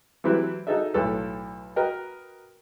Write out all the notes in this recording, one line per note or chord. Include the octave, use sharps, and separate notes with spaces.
E3 F#3 C4 E4 G4 B4
D#4 F#4 G#4 A4 D#5 E5
B1 A2 A4 B4
F#4 A#4 B4 D#5 G5